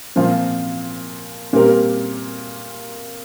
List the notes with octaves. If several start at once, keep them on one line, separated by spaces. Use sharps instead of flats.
A#2 F3 C4 F4
A#2 G3 C4 G4 A#4